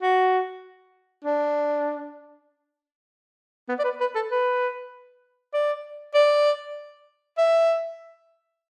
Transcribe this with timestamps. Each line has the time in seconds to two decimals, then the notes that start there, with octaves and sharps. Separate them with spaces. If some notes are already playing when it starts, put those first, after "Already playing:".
0.02 F#4
1.25 D4
3.69 B3
3.79 D5
3.84 B4
4.01 B4
4.15 A4
4.32 B4
5.54 D5
6.14 D5
7.38 E5